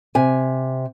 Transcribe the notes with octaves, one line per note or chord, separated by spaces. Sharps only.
C3 G#5